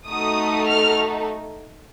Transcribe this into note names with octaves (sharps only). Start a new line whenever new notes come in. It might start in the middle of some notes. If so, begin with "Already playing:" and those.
A3 D#4 F#4 A4 D#6
F6